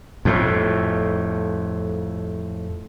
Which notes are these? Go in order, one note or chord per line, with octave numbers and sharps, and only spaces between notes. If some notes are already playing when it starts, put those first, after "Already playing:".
F2 A2